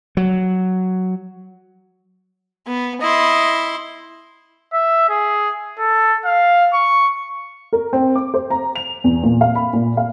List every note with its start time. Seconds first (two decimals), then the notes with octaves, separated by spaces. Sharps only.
0.17 F#3
2.67 B3
3.01 E4 D#5 C6
4.73 E5
5.09 G#4
5.79 A4
6.25 F5
6.74 C#6
7.73 A#4
7.93 C4
8.16 D6
8.34 C5
8.50 A#5
8.76 F7
9.04 E2
9.23 A#2
9.41 F5
9.55 B5
9.73 A#2
9.97 F5